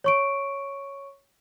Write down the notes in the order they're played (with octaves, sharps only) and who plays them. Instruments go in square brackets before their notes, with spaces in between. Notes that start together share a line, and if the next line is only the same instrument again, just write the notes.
[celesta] C#5 C#6 D7